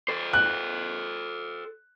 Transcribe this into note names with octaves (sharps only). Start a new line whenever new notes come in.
A4 C5
F#6